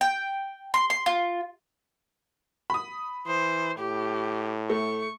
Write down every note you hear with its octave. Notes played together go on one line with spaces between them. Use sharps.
G5
C6
C6
F4
B5 D#6
E3 C5
A2 G4
A3 C#6